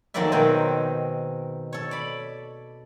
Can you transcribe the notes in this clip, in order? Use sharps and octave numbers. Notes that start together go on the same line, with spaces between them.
F2 D#3 F#3 A#3 D5 E5
B2 D#3 C4 G#4
A4 C#5
D5 B5